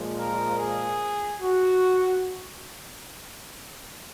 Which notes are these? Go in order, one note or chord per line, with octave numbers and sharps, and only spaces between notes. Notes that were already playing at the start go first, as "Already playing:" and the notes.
Already playing: A#2 F3 G#3
A#4
G#4
F#4